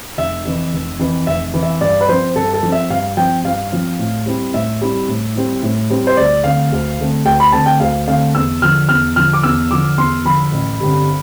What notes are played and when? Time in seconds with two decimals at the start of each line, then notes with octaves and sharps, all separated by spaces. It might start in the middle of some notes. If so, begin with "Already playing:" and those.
0.18 F1 E5
0.45 F2 E3
0.73 F1
0.99 F2 E3
1.27 F1 E5
1.54 F2 E3
1.63 E5
1.81 G2 D5
2.01 B4
2.09 F3 C4 C5
2.36 G2 A4
2.54 A4
2.63 F3 C4
2.72 E5
2.90 G2 F5
3.17 F3 C4 G5
3.44 G2 F5
3.72 F3 C4
3.99 A2
4.26 G3 C4 E4
4.53 A2 E5
4.81 G3 C4 E4
5.08 A2
5.35 G3 C4 E4
5.63 A2
5.90 G3 C4 E4
6.07 C5
6.17 D2 D5
6.44 D3 A3 C4 F5
6.72 D2
6.99 D3 A3 C4
7.25 D2 G5
7.40 B5
7.53 D3 A3 C4 A5
7.66 G5
7.80 D2 F5
8.07 D3 A3 C4 F5
8.34 E2 E6
8.62 D3 F3 F6
8.89 E2 F6
9.16 D3 F3 F6
9.33 D6
9.43 E2 E6
9.71 D3 F3 D6
9.98 E2 C6
10.25 D3 F3 B5
10.52 A1
10.80 G2 D3 G3 C4